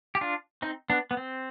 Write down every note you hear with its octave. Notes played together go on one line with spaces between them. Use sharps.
G4
D4 F4
C4 D#4
B3 D4
B3
C4